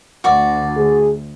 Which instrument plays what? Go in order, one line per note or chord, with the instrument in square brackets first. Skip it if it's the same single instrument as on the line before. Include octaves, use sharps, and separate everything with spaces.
[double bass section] D2 [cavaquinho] F#4 D5 D6
[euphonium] G#4